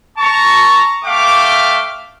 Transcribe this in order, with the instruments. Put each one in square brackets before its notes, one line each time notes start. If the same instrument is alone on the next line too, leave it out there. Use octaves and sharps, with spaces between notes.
[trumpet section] A5 A#5 C#6
A3 E5 F5 G5 D6